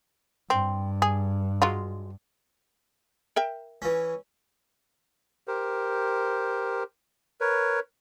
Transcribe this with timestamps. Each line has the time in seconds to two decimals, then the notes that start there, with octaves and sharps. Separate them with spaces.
0.50 G2 C4
1.02 G#4
1.62 F#3 G#3 F4
3.36 A#4 E5 G5
3.82 E3 C#4
5.48 G4 A#4 C5
7.41 A#4 B4 C#5